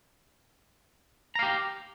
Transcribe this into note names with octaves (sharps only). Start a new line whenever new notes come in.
G4 F5 A#5